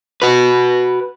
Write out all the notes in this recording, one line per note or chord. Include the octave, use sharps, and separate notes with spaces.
F#4 B4